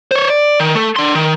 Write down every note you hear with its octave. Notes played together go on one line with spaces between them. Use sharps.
C5 C#5
D5
D#3
A3 A4
D4 C6
D#3